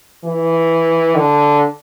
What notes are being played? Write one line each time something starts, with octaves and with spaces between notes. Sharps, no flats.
E3
D3